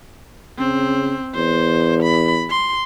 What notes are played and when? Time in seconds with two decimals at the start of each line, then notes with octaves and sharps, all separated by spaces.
0.59 C#3 C4
1.35 E2 C5
2.03 B5
2.51 C6